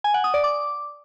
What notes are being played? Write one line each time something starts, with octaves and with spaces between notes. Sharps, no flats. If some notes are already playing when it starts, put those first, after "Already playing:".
G#5
F#5
D#6
D5
D6